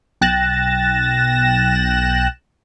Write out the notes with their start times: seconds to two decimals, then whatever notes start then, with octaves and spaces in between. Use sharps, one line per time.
0.21 B1 G5 F#6 A6 A#6 E7